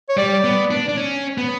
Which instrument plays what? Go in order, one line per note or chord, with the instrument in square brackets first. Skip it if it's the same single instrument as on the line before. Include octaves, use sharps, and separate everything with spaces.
[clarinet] C#5
[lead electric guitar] G3 [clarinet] D5
[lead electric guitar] B3
D4
D4
C#4
B3